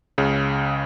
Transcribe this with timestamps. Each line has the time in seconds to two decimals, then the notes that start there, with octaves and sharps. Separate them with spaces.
0.18 C#2 C#3